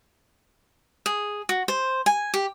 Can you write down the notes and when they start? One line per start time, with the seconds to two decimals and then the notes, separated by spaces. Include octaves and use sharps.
1.06 G#4
1.49 F#4
1.68 C5
2.06 G#5
2.34 G4